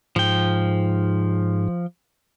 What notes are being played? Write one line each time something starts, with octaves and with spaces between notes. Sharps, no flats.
G#2 F3 G5